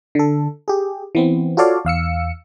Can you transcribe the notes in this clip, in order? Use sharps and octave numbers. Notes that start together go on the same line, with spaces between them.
D3 A4
G4 G#4
E3 B3 C4
F4 F#4 A4 C#5 D5 F5
E2 F5 E6 C#7